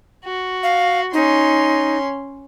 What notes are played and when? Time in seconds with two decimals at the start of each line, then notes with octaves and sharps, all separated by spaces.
0.24 F#4
0.63 F5
1.13 C#4 D#4 C6